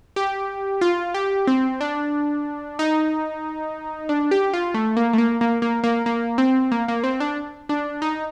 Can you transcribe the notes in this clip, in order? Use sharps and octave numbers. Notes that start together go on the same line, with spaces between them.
G4
F4
G4
C4
D4
D#4
D4
G4
F4
A3
A#3
A3
A#3
A#3
A#3
A#3
A#3
C4
A#3
A#3
C4
D4
D4
D#4